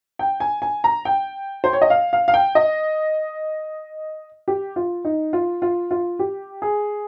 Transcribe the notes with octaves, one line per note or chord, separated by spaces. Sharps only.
G5
G#5
G#5
A#5
G5
C5
C#5
D#5
F5
F5
F5
G5
D#5
G4
F4
D#4
F4
F4
F4
G4
G#4